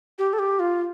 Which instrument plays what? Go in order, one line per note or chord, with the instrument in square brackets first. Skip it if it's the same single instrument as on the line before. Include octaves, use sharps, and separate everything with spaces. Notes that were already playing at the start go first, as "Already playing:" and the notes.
[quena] G4
A4
G4
F4